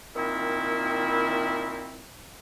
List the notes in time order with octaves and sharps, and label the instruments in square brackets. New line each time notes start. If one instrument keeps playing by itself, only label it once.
[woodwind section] A#2 D#3 C4 E4